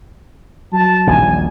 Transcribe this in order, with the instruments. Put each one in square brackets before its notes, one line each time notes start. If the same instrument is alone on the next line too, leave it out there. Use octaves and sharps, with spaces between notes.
[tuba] F#3 [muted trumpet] A5
[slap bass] D#1 A#1 [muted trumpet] G#5